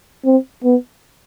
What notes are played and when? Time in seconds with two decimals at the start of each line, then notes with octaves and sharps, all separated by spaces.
0.25 C4
0.64 B3